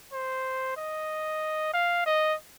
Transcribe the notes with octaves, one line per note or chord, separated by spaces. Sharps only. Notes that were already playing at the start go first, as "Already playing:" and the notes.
C5
D#5
F5
D#5